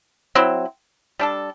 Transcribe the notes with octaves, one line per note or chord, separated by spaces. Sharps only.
F#3 C4 E4
G3 D4 A4